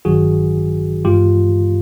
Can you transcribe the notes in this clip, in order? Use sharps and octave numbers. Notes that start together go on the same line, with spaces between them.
G#1 G2 D#3 F#3 F#4 G#4
G2 E3 G#3 F4 G4